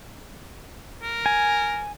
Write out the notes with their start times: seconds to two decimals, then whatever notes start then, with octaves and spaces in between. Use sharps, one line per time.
1.03 A#4
1.26 G#5